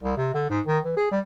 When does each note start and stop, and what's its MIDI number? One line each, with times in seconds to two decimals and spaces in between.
0.03 0.17 36
0.17 0.34 48
0.34 0.45 50
0.49 0.61 44
0.67 0.79 51
0.85 0.93 52
0.97 1.07 68
1.11 1.20 55